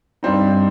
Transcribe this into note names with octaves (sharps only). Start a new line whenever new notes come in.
G2 G3 C4 D#4